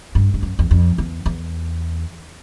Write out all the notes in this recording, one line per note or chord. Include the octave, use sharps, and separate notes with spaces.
G2
G2
F#2
E2
F2
E2
E2